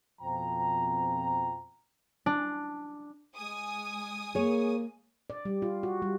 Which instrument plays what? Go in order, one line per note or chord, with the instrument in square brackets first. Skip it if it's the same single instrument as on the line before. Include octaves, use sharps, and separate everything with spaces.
[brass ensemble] F2 B2 F3 C4 G5 A#5
[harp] D4
[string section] G#3 G#5 D#6
[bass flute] A#3 [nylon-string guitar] G#4 C#5
[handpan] D5
G3
F4
F#4
G3